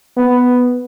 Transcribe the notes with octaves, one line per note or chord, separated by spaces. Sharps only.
B3